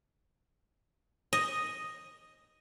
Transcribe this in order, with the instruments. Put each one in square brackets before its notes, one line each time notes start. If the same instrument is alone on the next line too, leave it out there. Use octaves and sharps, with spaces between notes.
[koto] D#5